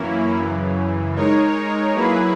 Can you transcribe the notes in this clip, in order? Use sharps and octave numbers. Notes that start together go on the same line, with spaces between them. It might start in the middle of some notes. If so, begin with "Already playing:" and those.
Already playing: F#2 E3 A#3 C#4 E4
F#2 C#3 E3
G#3 D#4 A#4 C#5
F#3 A#3 E4 G#4 B4